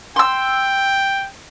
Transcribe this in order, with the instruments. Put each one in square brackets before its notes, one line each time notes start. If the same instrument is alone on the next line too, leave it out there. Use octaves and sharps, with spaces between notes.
[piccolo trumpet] G5 [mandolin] C6 E6